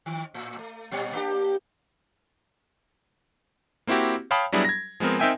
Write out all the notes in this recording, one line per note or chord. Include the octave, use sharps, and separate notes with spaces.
D#3
A2
A3
A#2 G3 C#5
A#3 D4 G4
A#3 C4 E4 F#4 G4
C#5 F5 G5 A5 B5 D#6
F#3 G3 B3 D4 E4 G#4
G#6 A#6
F3 G#3 B3 C4 A#4
C4 D#4 A#4 E5 G5 G#5